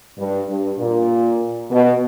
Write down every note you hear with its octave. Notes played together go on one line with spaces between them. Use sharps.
G2
G2
A#2
B2